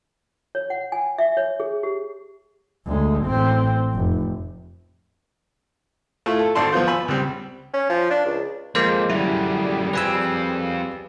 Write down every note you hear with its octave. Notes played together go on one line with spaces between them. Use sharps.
C#5
F#5
G#5
E5
C#5
G#4
G4
D2 G#3
A1 C4
F1
A3 E4 F4
A4
G#1 A4 D5 A5 C6
F3 B3 F4 C5
G#5 B5 E6
C#2 G3 C4
C#4
F3
D4
C#2
F2 G#3 A#3 C5
F#2 D3 G3 E4 G#4
F2 C4 B4 G#5 E6